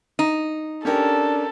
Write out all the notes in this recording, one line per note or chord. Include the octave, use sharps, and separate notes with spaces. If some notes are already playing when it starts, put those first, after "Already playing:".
D#4
C#4 D4 G4 A4 A#4